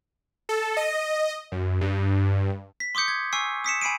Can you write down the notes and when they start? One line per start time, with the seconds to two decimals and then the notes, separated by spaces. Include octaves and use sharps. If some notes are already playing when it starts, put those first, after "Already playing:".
0.49 A4
0.77 D#5
1.52 F#2
1.81 G2
2.80 B6
2.95 C6 D6 D#6 G6 C#7
3.08 G#6
3.33 G#5 C#6 E6 C7
3.64 D#6 B6 C#7 E7
3.81 G#5 B5 C7 D7 D#7